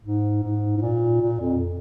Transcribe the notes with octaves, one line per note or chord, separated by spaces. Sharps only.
G#2
G#2
G#2
A#2
A#2
F2